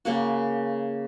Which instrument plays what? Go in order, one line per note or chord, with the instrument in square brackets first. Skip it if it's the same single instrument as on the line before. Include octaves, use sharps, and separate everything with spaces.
[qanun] C#3 A#3 F#4